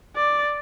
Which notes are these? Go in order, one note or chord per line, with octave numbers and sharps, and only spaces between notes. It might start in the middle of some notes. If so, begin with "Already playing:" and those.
D5